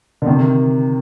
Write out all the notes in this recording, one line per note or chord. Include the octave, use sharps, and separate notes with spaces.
D3
C3 D#3